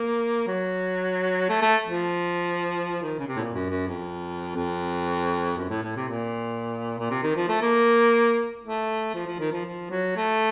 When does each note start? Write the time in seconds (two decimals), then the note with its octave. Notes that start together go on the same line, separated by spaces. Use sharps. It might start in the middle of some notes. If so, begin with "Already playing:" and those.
Already playing: A#3
0.47 F#3
1.50 A3
1.62 A3
1.87 F3
3.02 D#3
3.19 C#3
3.28 C3
3.36 A2
3.40 A#2
3.54 F#2
3.70 F#2
3.87 F2
4.55 F2
5.58 F#2
5.70 A2
5.83 A2
5.96 C3
6.08 A#2
6.99 A#2
7.11 C3
7.23 D#3
7.36 F3
7.49 A3
7.62 A#3
8.64 A3
9.15 F3
9.27 F3
9.40 D#3
9.52 F3
9.65 F3
9.91 F#3
10.17 A3